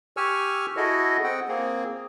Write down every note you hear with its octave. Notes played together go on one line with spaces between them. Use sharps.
G4 G#5 C#6 E6 F6
E4 F#4 G#4 A4 D#5
C4 F#5 G5
A#3 C4 G#4